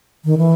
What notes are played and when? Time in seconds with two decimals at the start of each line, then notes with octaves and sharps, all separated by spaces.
0.25 D#3
0.38 E3